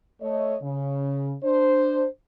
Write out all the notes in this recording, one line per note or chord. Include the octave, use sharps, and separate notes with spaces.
A3 C#5 D#5
C#3
D4 C5